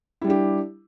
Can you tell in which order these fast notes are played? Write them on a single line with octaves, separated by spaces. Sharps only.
E4 G3 D4 G4